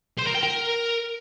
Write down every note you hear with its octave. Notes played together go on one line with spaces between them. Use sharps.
C5
A#4
G5
A#4